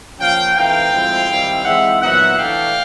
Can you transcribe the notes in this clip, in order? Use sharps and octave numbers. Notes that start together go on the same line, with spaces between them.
F3 A#3 C#4 F5 G5
E3 A3 C4 D#4 F5 G5
A2 F3 G#3 C4 E4
D#3 G3 C4 E4
E3 G#3 C4 D#4 E5 F#5
A#2 F#3 B3 D#4 E5 F#5
E3 A3 D4 F5 G5